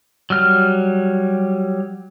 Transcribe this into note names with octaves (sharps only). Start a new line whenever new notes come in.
F#3 G3 F6